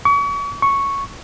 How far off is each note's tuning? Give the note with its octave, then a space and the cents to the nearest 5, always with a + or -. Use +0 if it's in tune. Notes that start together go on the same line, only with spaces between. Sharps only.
C#6 +40
C#6 +0